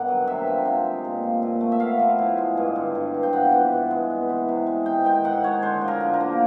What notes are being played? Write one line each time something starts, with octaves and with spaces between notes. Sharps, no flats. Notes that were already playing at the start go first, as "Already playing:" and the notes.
Already playing: G2 D#3 B3 F#5
F#3
C3 E5
F3
C3
G#3
A#2
F3
A#2
A3
E5
B3 F5
F3
A2
G#3
G2
D3
G2
F3
G5
B3 F#5
E3
G2
G#3
B3
E3
C3
G#3
G#2 G5
D#3 G5
G#2 F#5
G#3 C#5
D3 C5
F3
A#4
D3
A#4
A#3